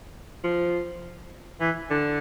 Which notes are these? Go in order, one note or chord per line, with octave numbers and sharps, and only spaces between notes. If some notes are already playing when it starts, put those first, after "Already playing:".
F3
E3
D3